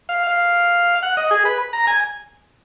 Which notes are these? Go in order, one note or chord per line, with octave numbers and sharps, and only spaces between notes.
F5
F5
F#5
D#5
G#4
B4
A#5
G#5